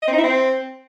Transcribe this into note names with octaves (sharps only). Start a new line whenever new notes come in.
D#5
C4
D#4
E4
C4